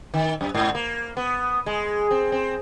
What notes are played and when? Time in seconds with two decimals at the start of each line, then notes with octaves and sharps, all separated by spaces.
0.14 D#3
0.41 F#2
0.55 G#2
0.75 A#3
1.17 B3
1.66 G#3
2.11 C4
2.32 C4